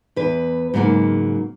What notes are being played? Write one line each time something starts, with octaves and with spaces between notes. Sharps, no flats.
E2 B4
G#2 C#3 F#3 A#3